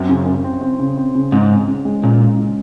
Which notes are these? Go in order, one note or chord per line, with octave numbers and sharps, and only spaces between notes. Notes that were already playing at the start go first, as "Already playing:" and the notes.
Already playing: F#2 C4
C#3
C#3
C4
C4
C#3
C4
C#3
G#2 C#3
C4
C#3
G#3
A#2 C#3
G#3
C#3